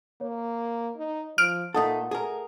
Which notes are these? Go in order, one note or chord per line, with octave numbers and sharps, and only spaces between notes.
A#3 C#5
D#4
F3 F6 D7
A#2 A3 D#4 A4 F#5 D#6
A3 G#4 A#4